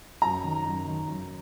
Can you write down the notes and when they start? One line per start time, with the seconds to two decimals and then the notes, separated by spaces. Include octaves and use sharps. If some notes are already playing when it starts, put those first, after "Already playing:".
0.22 F#2 A#5
0.44 D#3
0.65 F#2
0.87 D#3
1.07 F#2